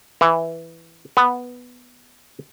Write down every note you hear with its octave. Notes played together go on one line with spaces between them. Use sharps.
E3
B3